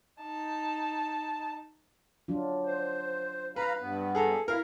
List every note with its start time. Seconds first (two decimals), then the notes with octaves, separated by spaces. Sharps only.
0.23 D#4 A5
2.28 F#3 D4 F4
2.66 C5
3.56 B4 F5 A#5 B5
3.81 G2 B3
4.15 G#4 A4 A#5
4.48 E4 A#4 F5